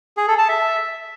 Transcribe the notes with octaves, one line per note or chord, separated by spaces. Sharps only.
G#4
A4
A5
E5